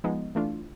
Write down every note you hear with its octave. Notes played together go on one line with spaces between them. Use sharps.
F3 G#3 B3 D#4
E3 A3 D4 F4